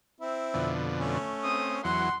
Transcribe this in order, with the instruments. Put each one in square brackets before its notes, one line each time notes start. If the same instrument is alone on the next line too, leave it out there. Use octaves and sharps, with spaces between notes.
[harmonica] C4 E4
[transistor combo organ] F2 B2 D3
[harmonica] A3 C#4
[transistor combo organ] C4 [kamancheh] D#6
[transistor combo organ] E2 F#3 [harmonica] F#5 [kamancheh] C6